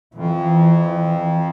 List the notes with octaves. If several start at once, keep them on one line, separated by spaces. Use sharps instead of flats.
F2 E3